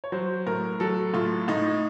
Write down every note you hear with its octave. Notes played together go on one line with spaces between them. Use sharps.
C#5
F#3 C5
A2 A#4
F#3 A4
A2 F4
A2 D#4